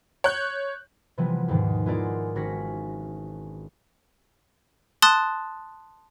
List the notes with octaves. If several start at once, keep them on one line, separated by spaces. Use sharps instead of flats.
C#5 F#6 G6
C3 E3 F3 G3 B3
D#2 G#2 B2 D#3
G#3 B3 E4 F4 A#4 D5
G#1 C#4 F#4 A#6 B6 C#7
A5 C6 D#6 F#6 A6